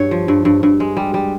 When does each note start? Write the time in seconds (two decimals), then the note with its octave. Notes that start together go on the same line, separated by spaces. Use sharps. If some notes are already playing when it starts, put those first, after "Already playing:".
Already playing: G2 C#5
0.11 F3
0.28 G2
0.45 G2
0.63 G2
0.80 G#3
0.97 G3
1.14 G3